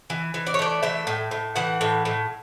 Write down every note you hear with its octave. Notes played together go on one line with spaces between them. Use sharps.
E3
E3
D5
C#5
A3 D5
E3 E5
A2
A2
E3 F#5
A2
A2